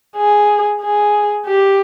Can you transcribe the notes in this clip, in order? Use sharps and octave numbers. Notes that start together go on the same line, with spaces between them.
G#4
G#4
G4